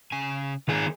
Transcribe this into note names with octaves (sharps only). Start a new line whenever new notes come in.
C#3 G#5
D#3 F4 G#4 A#4